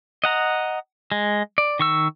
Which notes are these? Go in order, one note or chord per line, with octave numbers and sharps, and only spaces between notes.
D#5 F#5 A#5
G#3
D5
D#3 C#6 E6